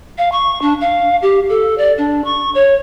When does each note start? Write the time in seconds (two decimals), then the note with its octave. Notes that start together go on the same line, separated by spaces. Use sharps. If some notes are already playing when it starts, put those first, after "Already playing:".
0.18 F5
0.32 C#6
0.62 D4
0.81 F5
1.22 G4
1.49 A4
1.78 D5
1.98 D4
2.24 C#6
2.55 C#5